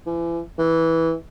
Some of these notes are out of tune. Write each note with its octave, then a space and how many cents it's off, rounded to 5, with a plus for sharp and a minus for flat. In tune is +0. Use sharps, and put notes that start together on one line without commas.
E3 +35
E3 -10